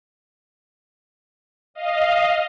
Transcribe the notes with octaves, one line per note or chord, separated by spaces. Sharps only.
D#5 F5